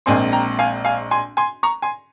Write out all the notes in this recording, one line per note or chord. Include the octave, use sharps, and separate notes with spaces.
A#1 A#2 G#3 C4 G#5 C6
G5 A#5
F5 G#5
F5 G#5
G#5 C6
G#5 C6
A#5 C#6
G#5 C6